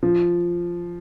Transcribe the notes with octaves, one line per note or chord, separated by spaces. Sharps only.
F3